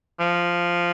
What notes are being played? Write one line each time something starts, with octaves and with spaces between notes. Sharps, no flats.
F3